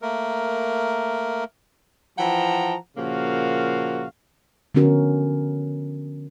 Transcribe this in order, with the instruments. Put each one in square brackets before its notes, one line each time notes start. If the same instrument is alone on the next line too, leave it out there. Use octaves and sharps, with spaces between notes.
[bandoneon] A3 A#3 A#4
[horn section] E3 F3 F#5 G5 A5 A#5
A#2 C#3 F3 A#3 F#4 F5
[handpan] D3 F3 B3 C#4 F#4 A#4